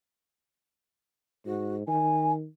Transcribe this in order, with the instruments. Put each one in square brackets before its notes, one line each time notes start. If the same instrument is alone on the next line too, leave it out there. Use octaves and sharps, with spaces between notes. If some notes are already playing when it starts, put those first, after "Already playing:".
[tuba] G#2 [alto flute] F#4
[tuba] D#3 [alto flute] G#5